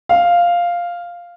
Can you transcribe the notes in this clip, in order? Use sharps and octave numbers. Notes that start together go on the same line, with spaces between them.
F5